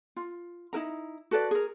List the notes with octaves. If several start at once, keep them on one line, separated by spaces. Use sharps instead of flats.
F4
D#4 E4 A#4 A#5
F#4 A4 B4 D5
G#4 A#4